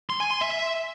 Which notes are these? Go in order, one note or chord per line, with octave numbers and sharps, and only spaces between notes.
C6
G#5
C6
E5